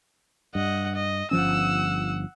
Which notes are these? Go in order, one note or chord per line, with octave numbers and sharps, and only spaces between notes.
G2 D#5 F#5
D#5
G1 F3 C#4 F#5 E6